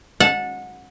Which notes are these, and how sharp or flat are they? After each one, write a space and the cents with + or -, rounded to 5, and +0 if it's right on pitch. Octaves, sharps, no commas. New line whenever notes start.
F#5 -20 A5 +0